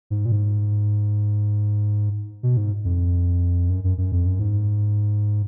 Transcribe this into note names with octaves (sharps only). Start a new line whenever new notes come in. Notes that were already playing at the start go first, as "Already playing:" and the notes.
G#2
A#2
G#2
B2
G#2
F2
F#2
F#2
F#2
F2
F#2
G#2